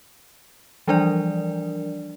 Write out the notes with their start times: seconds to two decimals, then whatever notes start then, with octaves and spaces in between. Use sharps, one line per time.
0.87 E3 F3 G3 D4 A#4 D5